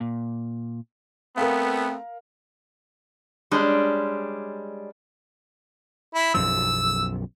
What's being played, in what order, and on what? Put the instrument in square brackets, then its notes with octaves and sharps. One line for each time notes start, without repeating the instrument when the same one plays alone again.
[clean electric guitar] A#2
[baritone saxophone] A3 [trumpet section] B3 [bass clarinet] C4 [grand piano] A#4 F5
[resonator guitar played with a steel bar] G3 G#3 C#4 D4
[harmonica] E4
[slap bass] B1 F#2 F3 [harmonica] E6